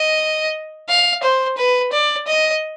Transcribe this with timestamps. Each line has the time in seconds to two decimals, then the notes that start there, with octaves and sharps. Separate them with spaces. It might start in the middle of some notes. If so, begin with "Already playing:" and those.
Already playing: D#5
0.89 F5
1.23 C5
1.57 B4
1.92 D5
2.28 D#5